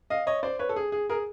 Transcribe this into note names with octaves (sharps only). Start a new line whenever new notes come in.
D#5 F5
C#5 D#5
C5 D5
B4 C#5
A4
G#4
G#4
G#4 A#4